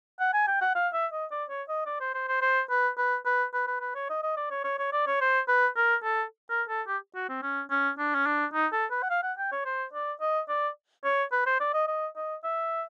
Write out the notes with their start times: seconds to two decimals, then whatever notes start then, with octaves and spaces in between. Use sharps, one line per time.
0.20 F#5
0.34 G#5
0.48 G5
0.61 F#5
0.75 F5
0.94 E5
1.13 D#5
1.31 D5
1.50 C#5
1.68 D#5
1.86 D5
2.01 C5
2.14 C5
2.28 C5
2.42 C5
2.70 B4
2.98 B4
3.26 B4
3.54 B4
3.68 B4
3.81 B4
3.95 C#5
4.09 D#5
4.23 D#5
4.37 D5
4.51 C#5
4.64 C#5
4.79 C#5
4.92 D5
5.07 C#5
5.21 C5
5.48 B4
5.76 A#4
6.04 A4
6.50 A#4
6.69 A4
6.87 G4
7.15 F#4
7.29 C4
7.43 C#4
7.70 C#4
7.99 D4
8.15 C#4
8.26 D4
8.54 D#4
8.73 A4
8.91 B4
9.03 F#5
9.10 F5
9.23 F#5
9.38 G5
9.52 C#5
9.65 C5
9.93 D5
10.21 D#5
10.49 D5
11.04 C#5
11.32 B4
11.46 C5
11.60 D5
11.74 D#5
11.88 D#5
12.16 D#5
12.44 E5